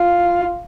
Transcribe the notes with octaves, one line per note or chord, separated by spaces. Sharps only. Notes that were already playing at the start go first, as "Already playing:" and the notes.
Already playing: F4